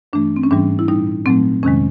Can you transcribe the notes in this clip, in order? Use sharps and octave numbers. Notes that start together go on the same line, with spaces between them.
G2 E3 A3 D4
C4
C#4
G#2 E3 G3 D4
E4
A#2 G3 D#4
A#2 F#3 A3 C4
F2 C3 D#3 G#3 C#4